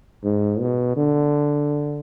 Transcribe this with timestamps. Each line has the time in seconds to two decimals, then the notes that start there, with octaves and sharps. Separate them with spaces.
0.24 G#2
0.60 B2
0.97 D3